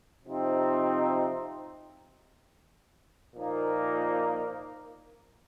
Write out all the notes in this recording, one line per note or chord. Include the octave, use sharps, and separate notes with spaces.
C3 F3 C4 D#4
A#2 F3 A#3 D#4